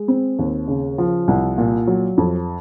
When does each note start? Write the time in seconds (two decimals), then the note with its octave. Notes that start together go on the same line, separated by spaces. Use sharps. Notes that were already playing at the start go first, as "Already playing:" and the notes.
Already playing: G#3
0.08 C4
0.39 D#2
0.68 C#3
0.98 F3
1.28 C2
1.58 A#2
1.87 F#3
2.18 F2